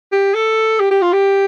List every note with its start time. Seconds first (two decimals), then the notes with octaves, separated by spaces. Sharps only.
0.12 G4
0.35 A4
0.80 G4
0.91 G4
1.02 F4
1.13 G4